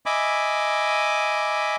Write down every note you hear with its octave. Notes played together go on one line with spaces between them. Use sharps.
D#5 E5 G#5 B5 D6